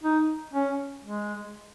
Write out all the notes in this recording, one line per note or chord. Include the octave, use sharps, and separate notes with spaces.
D#4
C#4
G#3